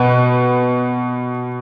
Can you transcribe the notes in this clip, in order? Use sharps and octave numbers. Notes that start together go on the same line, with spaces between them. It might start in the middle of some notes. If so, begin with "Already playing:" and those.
Already playing: B2 B4